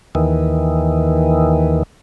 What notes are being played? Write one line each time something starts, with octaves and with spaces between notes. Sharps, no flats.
D#2 D#3 E3